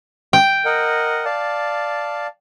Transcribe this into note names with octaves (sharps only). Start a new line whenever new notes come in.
G5
A#4 D#5 F#5
D5 F5 A5